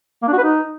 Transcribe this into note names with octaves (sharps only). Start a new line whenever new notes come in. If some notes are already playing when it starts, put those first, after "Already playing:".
A#3
D4
F#4
B4
D#4